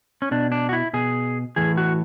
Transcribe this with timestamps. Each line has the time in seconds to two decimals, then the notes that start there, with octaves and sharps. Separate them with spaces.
0.22 C#4
0.31 B2 D4
0.52 D4
0.69 F#4
0.73 E4
0.93 B2 G#4
1.56 A2 E3 G#4
1.77 F#4